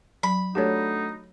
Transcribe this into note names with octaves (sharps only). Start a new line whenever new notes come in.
F#3 B5
A3 D4 D#4 F#4 G4 C#5